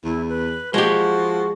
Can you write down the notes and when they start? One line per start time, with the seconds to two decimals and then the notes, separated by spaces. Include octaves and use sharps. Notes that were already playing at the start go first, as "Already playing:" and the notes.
0.04 E2 E4
0.29 B4
0.74 F3 G#3 F#4 G4